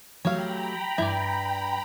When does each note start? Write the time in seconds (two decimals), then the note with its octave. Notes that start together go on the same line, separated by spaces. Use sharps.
0.25 F#3 A3 G4 C#5 F5 G5 A#5 B5
0.98 G2 E4 D5